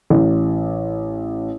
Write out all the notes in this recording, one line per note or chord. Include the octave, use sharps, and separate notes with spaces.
A1